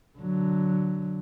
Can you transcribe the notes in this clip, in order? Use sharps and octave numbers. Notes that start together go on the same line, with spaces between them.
D3 F#3